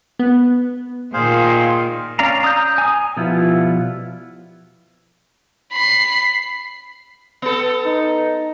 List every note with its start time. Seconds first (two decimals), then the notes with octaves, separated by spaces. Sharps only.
0.19 B3
1.14 A#2 D#3 G#4 C5 F5
2.19 C#4 D5 F5 A#5
2.43 A#5 D#6 E6 G6
2.78 G#5 D#6
3.17 B2 F3 G3 B3 E4 F4
5.73 B5 C7
7.42 B3 A4
7.85 D#4